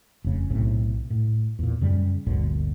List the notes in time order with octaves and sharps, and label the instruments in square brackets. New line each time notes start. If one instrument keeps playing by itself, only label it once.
[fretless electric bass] F1 C#3
B1 A2 C3
A2
E2 A#2
F#2 C#3 G3
G1 D2 A#2 D3